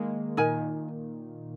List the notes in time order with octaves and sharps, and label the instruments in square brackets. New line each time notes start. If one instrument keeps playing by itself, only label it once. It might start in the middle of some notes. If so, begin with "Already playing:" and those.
Already playing: [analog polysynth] D#3 G#3 A#3
[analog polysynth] A#2 D#3 [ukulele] D#4 A#4 G#5